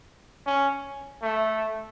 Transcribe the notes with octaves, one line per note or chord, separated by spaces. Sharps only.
C#4
A3